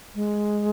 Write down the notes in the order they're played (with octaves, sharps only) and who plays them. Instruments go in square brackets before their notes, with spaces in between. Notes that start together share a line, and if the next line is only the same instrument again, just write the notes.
[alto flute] G#3